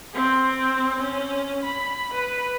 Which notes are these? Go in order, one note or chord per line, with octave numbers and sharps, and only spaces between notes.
C4
C#4
B5
B4